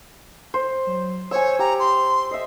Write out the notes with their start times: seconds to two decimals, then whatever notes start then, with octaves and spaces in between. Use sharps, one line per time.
0.54 C5
0.87 F#3
1.31 C5 C#5 G#5 E6
1.59 G4 A#5
1.79 C6
2.31 D#5 E5 C7